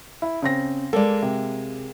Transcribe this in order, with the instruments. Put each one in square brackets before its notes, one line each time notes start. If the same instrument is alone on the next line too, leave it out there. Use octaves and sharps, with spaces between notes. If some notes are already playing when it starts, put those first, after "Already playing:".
[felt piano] E4
C#3 C4 A#6
[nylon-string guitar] G#3 A#3 [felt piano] A4 D5
[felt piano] C3